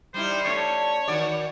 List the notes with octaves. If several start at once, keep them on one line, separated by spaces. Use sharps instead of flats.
G3 D#4 E4 C5
A3 C#4 C#5 D5
D#3 F#4 D5